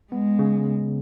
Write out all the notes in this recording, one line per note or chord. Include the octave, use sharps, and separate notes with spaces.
G#3 B3
C#3